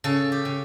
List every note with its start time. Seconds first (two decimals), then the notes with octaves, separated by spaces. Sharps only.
0.04 C#3 A4
0.32 G4
0.45 C#3